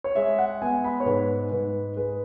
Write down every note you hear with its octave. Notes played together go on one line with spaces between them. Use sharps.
C#5
G#3 E5
F#5
B3 G#5
B5
C#5
G#2 B4
G#2 B4
G#3 B4